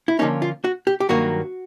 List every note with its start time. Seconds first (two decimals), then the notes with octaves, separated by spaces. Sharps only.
0.08 E4
0.19 D3 F3 A#3 C#4 D#4
0.42 F4
0.64 F#4
0.87 G4
1.00 G4
1.09 G2 D#3 F#3 A#3 F#4